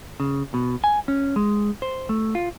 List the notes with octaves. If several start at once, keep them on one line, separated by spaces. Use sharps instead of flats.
C#3
B2
G#5
C#4
G#3
C5
A3
F4